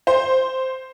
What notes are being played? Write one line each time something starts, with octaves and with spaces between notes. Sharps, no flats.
C5